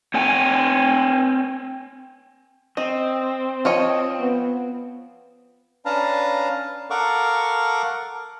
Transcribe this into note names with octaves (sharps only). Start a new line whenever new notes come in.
C4 C#5 G5 G#5
C4 D#5
F3 C#5 D#5
B3
C#4 D4 B4 F5 A5 A#5
A4 A#4 F5 F#5 C#6 D6